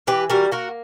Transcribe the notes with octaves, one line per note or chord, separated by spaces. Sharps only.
E3 G4 B4
G3 F#4 A#4
A#3 F#4 A#4